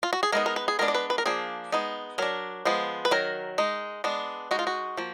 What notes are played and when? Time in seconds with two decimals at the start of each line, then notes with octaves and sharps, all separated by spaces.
0.03 F4
0.13 F#4
0.23 G#4
0.32 G#3 B3 D#4 A#4
0.46 A#4
0.56 B4
0.68 G#4
0.79 G#3 B3 D4 A#4
0.88 D5
0.94 B4
1.10 B4
1.18 A#4
1.26 F3 A#3 D4 G#4
1.72 G#3 B3 D#4
2.18 F#3 D4 A#4
2.65 F3 G#3 B3
3.05 B4
3.11 D#3 F#3 A#4
3.58 G#3 D#4
4.04 G#3 B3 D4
4.51 G#3 D#4 F#4
4.59 F4
4.67 F#4
4.97 F3 A#3